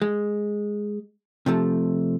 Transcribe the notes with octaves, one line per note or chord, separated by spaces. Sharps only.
G#3
C3 F3 A3